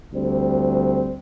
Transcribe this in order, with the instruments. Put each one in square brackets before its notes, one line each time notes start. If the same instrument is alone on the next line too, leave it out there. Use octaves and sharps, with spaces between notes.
[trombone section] D2 G3 C4